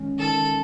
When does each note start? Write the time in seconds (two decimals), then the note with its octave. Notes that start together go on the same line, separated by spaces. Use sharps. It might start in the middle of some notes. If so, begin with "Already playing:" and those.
Already playing: D#3 G#3 C#4
0.19 D#3 A4